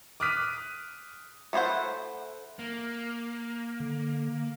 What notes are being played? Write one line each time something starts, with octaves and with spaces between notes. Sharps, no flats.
D6 D#6 F6 F#6 B6 D#7
A3 E4 G#4 C5 F#5
A#3
D3